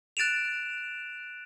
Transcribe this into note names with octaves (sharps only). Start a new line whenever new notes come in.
F#6 A6 D7 E7 F7